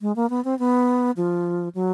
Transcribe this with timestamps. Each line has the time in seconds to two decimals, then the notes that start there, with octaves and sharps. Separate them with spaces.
0.02 G#3
0.16 A#3
0.30 B3
0.45 C4
0.59 B3
1.17 F3
1.75 F#3